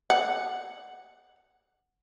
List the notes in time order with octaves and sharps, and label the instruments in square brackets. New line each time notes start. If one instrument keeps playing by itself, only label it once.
[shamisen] F#5